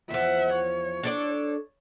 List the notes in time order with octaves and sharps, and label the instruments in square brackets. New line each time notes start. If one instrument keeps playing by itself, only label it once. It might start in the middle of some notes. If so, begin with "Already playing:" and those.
[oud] E2 F3 [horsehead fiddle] E5 F#5
[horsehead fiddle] C#5
[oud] D4 A4 D5